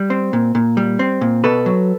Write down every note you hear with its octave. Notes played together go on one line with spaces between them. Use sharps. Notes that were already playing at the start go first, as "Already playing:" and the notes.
Already playing: G3
C4
A#2
A#2
G3
C4
A#2
B2 A4 B4
F#3